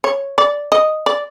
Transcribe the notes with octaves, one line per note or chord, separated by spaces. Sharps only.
C#5
D5
D#5
D5